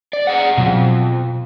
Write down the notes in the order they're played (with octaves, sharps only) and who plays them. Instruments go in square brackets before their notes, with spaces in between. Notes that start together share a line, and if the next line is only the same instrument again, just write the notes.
[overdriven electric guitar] D5
G#4 F#5
[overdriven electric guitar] F2 [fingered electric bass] B2 F#3